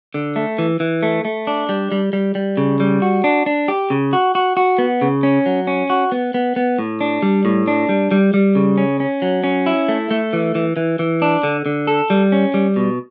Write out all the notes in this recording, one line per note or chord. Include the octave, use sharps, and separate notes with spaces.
D3
A3
E3
E3
A3
A3
D4
G3
G3
G3
G3
C#3
G3
F#4
D4
D4
G4
C#3
F#4
F#4
F#4
B3
C#3
C#4
F#3
C#4
F#4
B3
B3
B3
A2
D4
G3
A2
D4
G3
G3
G3
C#3
C#4
C#4
F#3
C#4
E4
A3
A3
E3
E3
E3
E3
D4
D3
D3
A4
G3
C#4
G3
B2